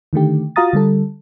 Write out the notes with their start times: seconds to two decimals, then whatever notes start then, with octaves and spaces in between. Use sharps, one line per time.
0.13 D3 D#3 A3 G4
0.56 F4 F#4 F5 A#5 D#6 A6
0.73 D3 G3 A4